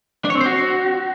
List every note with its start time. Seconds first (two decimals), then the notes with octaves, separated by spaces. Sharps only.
0.25 D4
0.30 C#5
0.35 C4
0.41 C5
0.46 F#4